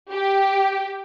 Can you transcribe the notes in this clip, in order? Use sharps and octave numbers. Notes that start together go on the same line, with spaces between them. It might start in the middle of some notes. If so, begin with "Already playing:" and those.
G4